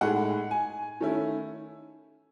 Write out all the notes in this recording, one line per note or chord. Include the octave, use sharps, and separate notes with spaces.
A2 G#3 D#4 F#5
G#5
D#3 A3 C#4 E4